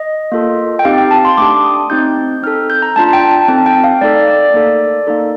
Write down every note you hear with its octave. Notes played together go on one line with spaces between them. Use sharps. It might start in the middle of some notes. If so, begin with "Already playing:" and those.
Already playing: D#5
A#3 F4 A4
G5
C4 D#4 G4 F5
G5
A5
C6
A3 D4 G4 D6
D#6
C4 D#4 G4 G6
C4 D#4 A4 F6
G6
A#5
A3 D4 F4 A5
G5
A5
C4 D#4 A4 A5
G5
F5
A3 D#4 A4 D5
D5
A#3 D#4 A4
A#3 D#4 A4